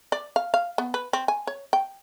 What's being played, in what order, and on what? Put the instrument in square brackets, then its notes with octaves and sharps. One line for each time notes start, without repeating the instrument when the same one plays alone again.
[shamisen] D5
F5
F5
B3
B4
C4
G#5
C#5
G5